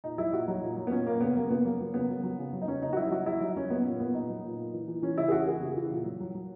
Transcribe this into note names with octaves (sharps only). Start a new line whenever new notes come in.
A#2 D#4
F#3 E4
A#2 F#4
F#3 D#4
A#2
F#3
B3
A#2 C#4
A#2 A#3
C#3 B3
F#3 A#3
C#3 B3
F#3 A#3
F#3
C#3 B3
F#3
F#3
C#3
F#3
D#4
F#3 C#4
C#3 D#4
F#4
F#3 E4
F#3 F#4
F#3 E4
F#3 D#4
F#3 C#4
F#3 B3
A#2
A#2 B3
A#2 D#4
F#3
A#2
A#2
E3
E3
E3 C#4
C#3 E4
G#4
E3 F#4
E3 G#4
C#3
E3
A#2
F#3
F#3
F#3